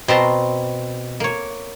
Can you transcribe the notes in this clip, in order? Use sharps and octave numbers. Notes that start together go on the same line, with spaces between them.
B2 C4 A5 A#5 C6
A#3 C#5